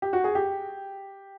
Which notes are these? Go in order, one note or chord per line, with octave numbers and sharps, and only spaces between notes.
G4
F#4
G#4
G4